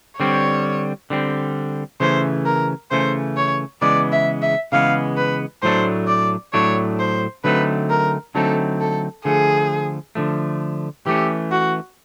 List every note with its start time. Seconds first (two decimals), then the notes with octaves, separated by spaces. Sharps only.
0.19 D3 G3 C4 C#5
1.10 D3 G3 C4
2.00 C#3 E3 A3 C#4 C5
2.46 A#4
2.91 C#3 E3 A3 C#4 C5
3.37 C#5
3.82 C#3 E3 G#3 B3 D5
4.13 E5
4.42 E5
4.72 C#3 E3 G#3 B3 F5
5.17 B4
5.63 A2 F#3 A3 D4 C5
6.08 D5
6.53 A2 F#3 A3 D4 C#5
7.00 C5
7.44 D3 F#3 A3 C4 D#4 B4
7.90 A#4
8.35 D3 F#3 A3 C4 D#4 A4
8.81 A4
9.25 D3 F3 A3 G#4
10.15 D3 F3 A3
11.06 E3 A3 C#4 G4
11.52 F#4